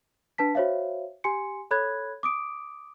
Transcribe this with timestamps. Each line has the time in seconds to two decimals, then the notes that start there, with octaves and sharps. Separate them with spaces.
0.38 D4 B4 A5 B6
0.55 F#4 C5 C#5 E5 F5
1.24 G4 G#5 C6 C#7
1.71 A4 C#5 B5 F#6 G#6
2.23 D6 D#6 D7